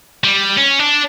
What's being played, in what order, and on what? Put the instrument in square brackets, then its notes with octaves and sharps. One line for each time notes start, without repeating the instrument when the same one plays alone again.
[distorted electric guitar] G3
C#4
D4